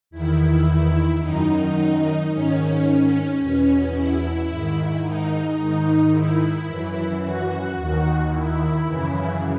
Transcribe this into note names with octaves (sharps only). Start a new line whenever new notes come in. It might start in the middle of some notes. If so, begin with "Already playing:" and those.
E2 D#3 E4
F#2 D#3 D#4
G#2 D#3 C#4
E2 B2 C#4
E4
G#2 D#3
D#4
G#2 D#3 D#4
E4
F#2 E3
F#4
D#2 D#3
E4
F#2 C#3 E3